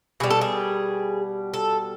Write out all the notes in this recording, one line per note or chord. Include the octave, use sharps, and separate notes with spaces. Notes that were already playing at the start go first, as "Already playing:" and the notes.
B2 G3 G#4
A4
G#4
A4